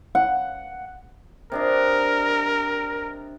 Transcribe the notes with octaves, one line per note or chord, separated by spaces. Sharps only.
F#5
C3 D4 A#4 D#5